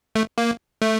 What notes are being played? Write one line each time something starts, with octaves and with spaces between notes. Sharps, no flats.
A3
A#3
A3